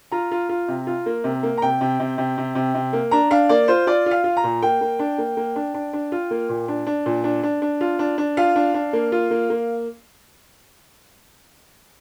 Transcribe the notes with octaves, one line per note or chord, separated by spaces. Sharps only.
F4 A#5
F4
F4
C3
F4
A#3
C3
A#3
A#5
C3 G5
C3
C3
C3
C3
C3
C3
A#3
D4 A#5
D4 F5
A#3 D5
F4 C5
F4 D5
F4
F5
F4
A#5
A#2
A#3 G5
A#3
D4
A#3
A#3
D4
D4
D4
F4
A#3
A#2
D4
D4
A#2
D4
D4
D4
F4
D4
D4
F4 F5
D4
D4
A#3
F4
A#3
A#3